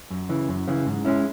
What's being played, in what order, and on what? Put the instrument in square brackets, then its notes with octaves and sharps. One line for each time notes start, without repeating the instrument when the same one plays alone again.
[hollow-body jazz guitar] F#2
C#3 E3
F#2
C#3 E3
G#2
G#3 C#4 E4